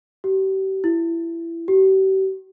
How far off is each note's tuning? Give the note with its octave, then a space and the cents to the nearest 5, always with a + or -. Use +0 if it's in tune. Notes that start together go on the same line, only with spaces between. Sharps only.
G4 -35
E4 +20
G4 -40